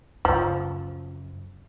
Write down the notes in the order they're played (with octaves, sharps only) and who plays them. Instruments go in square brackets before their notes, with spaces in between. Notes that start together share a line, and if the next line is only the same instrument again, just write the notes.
[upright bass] F#2 C#3 [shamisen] F3